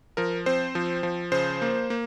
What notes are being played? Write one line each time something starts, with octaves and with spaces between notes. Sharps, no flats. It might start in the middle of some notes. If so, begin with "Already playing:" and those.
F3 A#4
C4 C5
F3
F3
C#3 C5
A#3
A#3